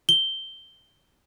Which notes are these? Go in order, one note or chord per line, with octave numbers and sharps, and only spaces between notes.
G7